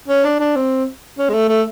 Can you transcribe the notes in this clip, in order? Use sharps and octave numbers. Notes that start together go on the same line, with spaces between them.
C#4
D4
D4
C4
C#4
G#3
A3
A3